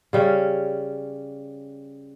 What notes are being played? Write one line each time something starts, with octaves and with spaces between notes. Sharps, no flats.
C#3 G3 C#4